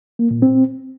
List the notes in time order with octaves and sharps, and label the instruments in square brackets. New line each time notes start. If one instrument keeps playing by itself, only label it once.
[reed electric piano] A#3
A#2
C4